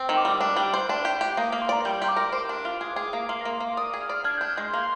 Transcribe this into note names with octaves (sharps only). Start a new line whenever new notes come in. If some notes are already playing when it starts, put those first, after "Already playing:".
Already playing: C4
D#3
D6
G3
D4 D6
G3
C5
D4
G4
G4
A#3 D#6
A#3 D6
C6
D5 A#5
G3 G6
G4 C6
D6
A#4
C5 D6
D4
F4
G#4
G#4
A#3
A#3 C6
A#3 A#5
C6
A#3 D6
D5 D#6
G#4
F6
D5
D4 G#6
G6
D4
G6
G#3 C6
A#3